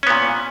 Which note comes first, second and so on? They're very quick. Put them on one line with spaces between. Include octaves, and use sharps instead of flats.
C#4 B3 A#2